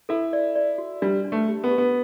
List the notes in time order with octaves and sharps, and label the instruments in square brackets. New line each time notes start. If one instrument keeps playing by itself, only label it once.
[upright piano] E4 [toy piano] A4
[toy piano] D5
D5
F#4
[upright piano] G3 [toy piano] D4
[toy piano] D4
[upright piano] A3
[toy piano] G4
[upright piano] B3
[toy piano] G4
[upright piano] B3